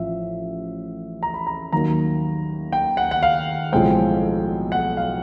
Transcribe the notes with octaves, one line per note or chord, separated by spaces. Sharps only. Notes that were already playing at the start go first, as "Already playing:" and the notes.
Already playing: A1 A2 F3 E5
A#5
B5
A#5
D#2 D#3 F#3 A#3 D#4 A#5
G5
F#5
F#5
F5
B1 A2 F3 G#3 C4 G5
F#5
F5